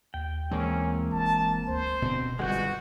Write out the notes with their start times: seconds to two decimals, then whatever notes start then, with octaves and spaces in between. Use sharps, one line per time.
0.14 D#2 G5
0.51 E3 G#3 A#3 C4 C#4
1.12 F1 A5
1.68 D2 C5
2.02 E1 B2 D3 C4
2.39 G1 C#3 G3 G#3 F#4 B4 G6